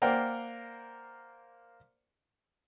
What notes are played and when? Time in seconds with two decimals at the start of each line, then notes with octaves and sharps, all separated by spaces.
0.02 A#3 A#4 C5 D5 F#5 G5